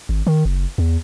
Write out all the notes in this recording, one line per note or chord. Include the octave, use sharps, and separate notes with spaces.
G#1
D#3
F#1
E2